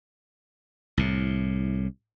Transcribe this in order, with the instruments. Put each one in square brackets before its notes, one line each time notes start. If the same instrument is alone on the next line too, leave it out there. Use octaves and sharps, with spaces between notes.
[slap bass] C2 A2